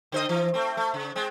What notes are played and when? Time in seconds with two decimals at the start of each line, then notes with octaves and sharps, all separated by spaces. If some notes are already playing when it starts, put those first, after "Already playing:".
0.12 D3 C5 D#5
0.29 E3
0.54 A3 C4
0.77 A3
0.94 C#3
1.16 G#3 C4